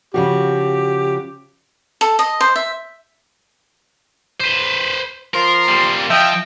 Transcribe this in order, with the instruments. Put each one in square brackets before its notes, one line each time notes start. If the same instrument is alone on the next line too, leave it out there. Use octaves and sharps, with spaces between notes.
[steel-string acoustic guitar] C#3 F3 F#4 [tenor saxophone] G4
[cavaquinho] A4
D#5
C5
E5
[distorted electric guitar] B4 C5
[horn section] F3 C6 [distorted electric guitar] A#4
[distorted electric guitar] G3 A#3
[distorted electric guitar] F3 [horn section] D#5 E5 G5